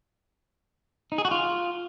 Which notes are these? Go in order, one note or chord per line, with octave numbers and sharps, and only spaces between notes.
D#4
G#4
F#4
F4